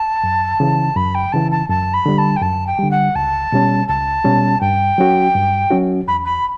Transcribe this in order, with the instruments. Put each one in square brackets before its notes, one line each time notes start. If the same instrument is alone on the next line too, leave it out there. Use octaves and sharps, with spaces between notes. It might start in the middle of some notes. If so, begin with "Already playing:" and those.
Already playing: [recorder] A5
[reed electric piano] F#2
C#3 E3
[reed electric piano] F#2 [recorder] B5
[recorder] G5
[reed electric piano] C#3 E3 [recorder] A5
[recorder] A5
[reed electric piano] F#2 [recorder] A5
[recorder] B5
[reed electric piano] D3 G3
[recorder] A5
G5
[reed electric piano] F#2 [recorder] A5
[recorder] G5
[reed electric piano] D3 G3
[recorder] F#5
[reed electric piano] C#2 [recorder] A5
[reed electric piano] B2 G3 C#4
[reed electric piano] C#2 [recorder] A5
[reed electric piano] B2 G3 C#4
[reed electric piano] G2 [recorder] G5
[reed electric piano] F#3 C#4 F#4
G2
F#3 C#4 F#4
[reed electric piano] E2 [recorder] B5
[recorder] B5